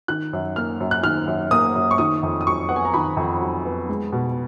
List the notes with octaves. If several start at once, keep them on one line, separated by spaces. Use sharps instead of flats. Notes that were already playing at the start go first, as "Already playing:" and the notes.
D#3 F#6
F#2
A#3 F6
F#2
F#6
D#3 F6
F#2
A#3 D#6
F#2
C#6
D#3 D#6
F2
D#6
F#3 C#6
B3 F#5
G#5
A#5
D#3 B5
F2
F#3
B3
G#3
B2